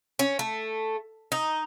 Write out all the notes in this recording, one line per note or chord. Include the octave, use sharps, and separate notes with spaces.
C#4
A3
D#4